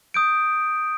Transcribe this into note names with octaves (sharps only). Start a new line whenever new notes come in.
D#6 G6 D7